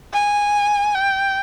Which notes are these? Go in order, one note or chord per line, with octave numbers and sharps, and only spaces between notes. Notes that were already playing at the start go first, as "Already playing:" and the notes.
G#5
G5